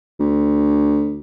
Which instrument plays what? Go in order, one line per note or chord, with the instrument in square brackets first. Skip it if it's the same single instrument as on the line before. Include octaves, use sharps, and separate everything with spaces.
[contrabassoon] D2